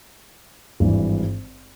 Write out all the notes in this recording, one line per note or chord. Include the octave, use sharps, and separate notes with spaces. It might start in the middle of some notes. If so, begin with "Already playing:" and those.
G#1 G2 E3